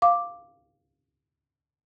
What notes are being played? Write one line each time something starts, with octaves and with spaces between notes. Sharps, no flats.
F5 D6